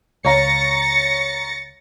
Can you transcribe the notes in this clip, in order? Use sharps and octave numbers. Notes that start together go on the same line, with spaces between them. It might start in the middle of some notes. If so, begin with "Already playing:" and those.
C#2 C#5 F5 A#5 A6 A#6 C#7